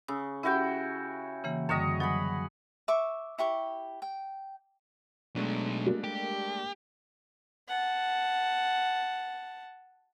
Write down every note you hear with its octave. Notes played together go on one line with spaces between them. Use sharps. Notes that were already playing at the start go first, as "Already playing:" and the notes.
C#3 D#6 E6
C#4 E4 F#4 G4 G5
C#3 E3 A#3
F#2 D3 G3 C#5 D#5
F#3 B4 G#5 B5
E5 C#6 D6
E4 G4 C#6
G5
B2 F#3 G#3 A3 D4
G3 A#3
G4
F#5 A5